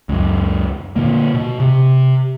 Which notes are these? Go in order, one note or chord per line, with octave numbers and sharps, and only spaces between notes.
C#2 F#2
A#2 D3 A#3
B2
C3